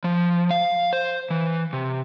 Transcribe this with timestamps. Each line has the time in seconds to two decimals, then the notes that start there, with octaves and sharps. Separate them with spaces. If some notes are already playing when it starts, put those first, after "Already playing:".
0.04 F3
0.51 F5
0.93 C5
1.30 E3
1.73 C3